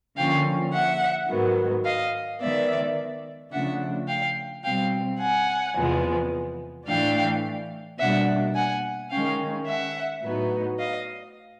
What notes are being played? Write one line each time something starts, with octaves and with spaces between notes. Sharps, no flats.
D3 F3 A#3 C#4 F5 G5
E5 F#5
G#2 D#3 F#3 B3
D#5 F5
D#3 G#3 B3 D5 E5
C#3 F3 A3 D4 E5 F#5
F5 G5
B2 G3 C4 F5 G5
F#5 G#5
E2 C3 F3 G#3 B3
A2 E3 A3 D4 F5 G5
B2 G3 A#3 D4 E5 F#5
F#5 G#5
D#3 G#3 C#4 F5 G5
E5 F#5
A2 F#3 B3 D#4
D#5 F5